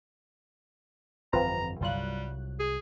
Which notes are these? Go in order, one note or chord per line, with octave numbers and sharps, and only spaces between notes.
G1 F2 E3 C4 F4 B4 A#5
G1 C2 F#3 G3 F4 F#6
G#4